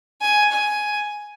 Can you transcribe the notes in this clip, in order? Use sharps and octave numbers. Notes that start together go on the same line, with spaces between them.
G#5
G#5